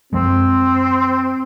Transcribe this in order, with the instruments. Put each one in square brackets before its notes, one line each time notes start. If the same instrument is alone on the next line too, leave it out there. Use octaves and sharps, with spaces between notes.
[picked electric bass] F#2 F3 G#3 [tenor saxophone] C4